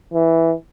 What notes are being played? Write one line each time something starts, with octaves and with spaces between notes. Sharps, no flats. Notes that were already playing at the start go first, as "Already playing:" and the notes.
E3